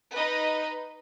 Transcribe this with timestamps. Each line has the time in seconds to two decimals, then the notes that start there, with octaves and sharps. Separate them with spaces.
0.12 D#4 B4 D#5